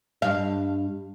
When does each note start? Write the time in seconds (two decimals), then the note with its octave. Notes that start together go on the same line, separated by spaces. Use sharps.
0.22 G2 F5